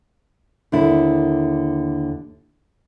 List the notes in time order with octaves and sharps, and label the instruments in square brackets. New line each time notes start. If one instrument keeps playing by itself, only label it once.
[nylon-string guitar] D#2 D3 E4